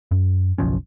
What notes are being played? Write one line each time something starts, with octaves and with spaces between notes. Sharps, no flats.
F#2
F#1 B1 F3 C#4